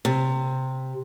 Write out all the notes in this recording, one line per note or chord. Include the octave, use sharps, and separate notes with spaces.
C3